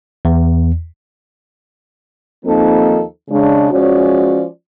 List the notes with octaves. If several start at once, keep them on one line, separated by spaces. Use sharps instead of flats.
E2
D#2 F3 A#3 C4 D#4 A4
C#3 G#3 D4
F3 G#3 C#4 F#4 C#5 D5